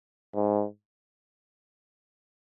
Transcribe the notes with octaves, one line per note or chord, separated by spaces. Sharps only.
G#2